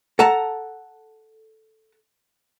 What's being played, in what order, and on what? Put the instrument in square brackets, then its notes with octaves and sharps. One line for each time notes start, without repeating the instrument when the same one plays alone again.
[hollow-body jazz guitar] A4 F#5 A5 A#5